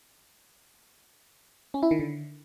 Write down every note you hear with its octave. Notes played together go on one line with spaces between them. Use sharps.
C#4
E4
D#3
D3